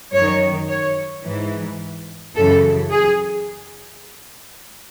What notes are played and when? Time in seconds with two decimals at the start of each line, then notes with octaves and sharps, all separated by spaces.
0.12 F#2 D#3 C#5
0.68 C#5
1.24 G#2 E3
2.35 F#2 C#3 E3 A4
2.91 G#4